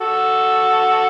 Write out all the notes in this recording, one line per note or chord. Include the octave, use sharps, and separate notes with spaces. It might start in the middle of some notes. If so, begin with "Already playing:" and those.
F#4 A4